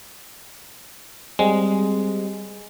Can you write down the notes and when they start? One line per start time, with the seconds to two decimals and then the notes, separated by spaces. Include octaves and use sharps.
1.39 G3 G#3 C4